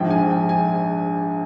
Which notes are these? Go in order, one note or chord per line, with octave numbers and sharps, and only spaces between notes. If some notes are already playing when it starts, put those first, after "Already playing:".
Already playing: A#1 G#2 F3 G5
G#5
G5
G#5